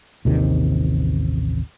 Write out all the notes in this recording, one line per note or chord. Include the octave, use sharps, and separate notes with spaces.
A1 D#2 C3 D#3